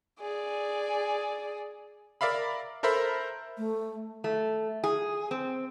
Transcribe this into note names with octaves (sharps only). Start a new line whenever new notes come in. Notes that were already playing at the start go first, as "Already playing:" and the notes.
G#4 D5
A#4 D5 E5 F5 B5
A4 A#4 C5 E5 B5
A3
A3
G#4
C4